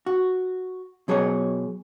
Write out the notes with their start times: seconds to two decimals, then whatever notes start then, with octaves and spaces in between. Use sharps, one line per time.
0.06 F#4
1.08 B2 F#3 G#4 C5 C#5